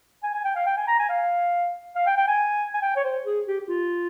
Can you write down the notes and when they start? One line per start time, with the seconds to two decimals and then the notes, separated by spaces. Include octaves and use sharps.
0.23 G#5
0.34 G#5
0.44 G5
0.56 F5
0.66 G5
0.77 G#5
0.88 A#5
0.99 G#5
1.09 F5
1.95 F5
2.07 G5
2.17 G5
2.28 G#5
2.74 G#5
2.82 G5
2.96 C#5
3.04 C5
3.25 G#4
3.47 G4
3.60 G4
3.69 F4